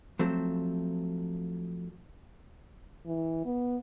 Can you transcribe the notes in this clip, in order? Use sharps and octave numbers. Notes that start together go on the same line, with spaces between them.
F3 F#3 A3 C4
E3
B3